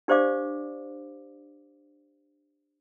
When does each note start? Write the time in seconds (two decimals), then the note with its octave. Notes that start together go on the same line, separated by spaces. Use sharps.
0.08 D4 G4 C5 D5 F5 D6